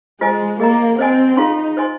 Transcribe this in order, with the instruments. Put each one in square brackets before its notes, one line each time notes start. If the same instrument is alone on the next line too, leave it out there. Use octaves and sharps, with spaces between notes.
[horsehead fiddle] G#3 [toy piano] F4 C5 D#5 G#5
[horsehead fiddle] A#3 [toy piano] G#4 D#5 A#5
[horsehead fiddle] C4 [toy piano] C5 D#5 G#5
[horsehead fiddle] D#4 [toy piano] F4 G#4 F5 C6
[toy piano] C5 D#5 G#5 C6